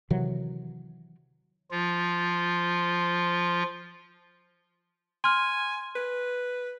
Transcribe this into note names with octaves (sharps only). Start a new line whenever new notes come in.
C3 D#3 E3 F#3
F3 F4
G#5 C6 F6
B4